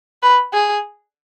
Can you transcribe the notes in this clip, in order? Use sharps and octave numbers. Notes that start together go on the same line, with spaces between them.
B4
G#4